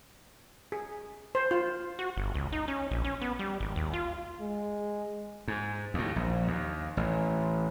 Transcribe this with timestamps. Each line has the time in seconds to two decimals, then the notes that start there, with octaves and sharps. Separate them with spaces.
0.72 G#4
1.35 C5
1.51 F4
1.99 F#4
2.17 G1
2.34 C#2
2.52 D#4
2.68 C#4
2.91 A#1
3.04 C#4
3.21 B3
3.39 G3
3.60 G#1
3.76 D#2
3.93 F4
4.40 G#3
5.48 G#2
5.94 D#2 A2
6.16 A#1
6.48 D#2
6.97 A1